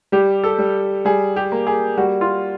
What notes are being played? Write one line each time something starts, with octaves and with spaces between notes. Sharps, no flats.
G3 G4
A4
G3
G3 G#4
G4
A#3
G#4
G3 F#4
F4